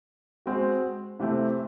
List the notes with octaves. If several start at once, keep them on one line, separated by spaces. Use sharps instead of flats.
G#3 C4 F#4
C3 E3 A3 C4